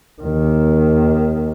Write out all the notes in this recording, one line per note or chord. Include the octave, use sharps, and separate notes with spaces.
D#2 D#3